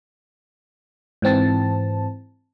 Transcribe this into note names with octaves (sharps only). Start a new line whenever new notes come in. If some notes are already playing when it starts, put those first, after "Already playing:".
G#2 E3 C4 A5